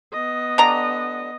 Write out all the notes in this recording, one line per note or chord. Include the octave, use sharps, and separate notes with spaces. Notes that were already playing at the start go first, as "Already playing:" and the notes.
B3 D#5
D3 G3 A#5